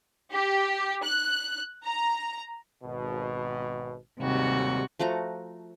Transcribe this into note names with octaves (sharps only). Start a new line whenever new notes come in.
G4
F#6
A#5
G#1 B2
D#2 G#2 C3 G3 F#4
F3 A3 F#4 A#5